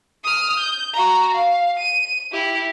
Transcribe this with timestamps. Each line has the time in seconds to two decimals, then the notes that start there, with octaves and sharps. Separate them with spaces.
0.24 D#6 F6
0.59 G6
0.93 F#4 A#5
1.34 F5
1.79 D#7
2.32 E4 G4